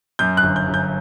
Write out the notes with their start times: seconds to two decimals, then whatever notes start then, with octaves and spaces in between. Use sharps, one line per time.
0.19 F#2 G6
0.37 F#6
0.43 G1
0.56 G6
0.68 G1
0.74 G6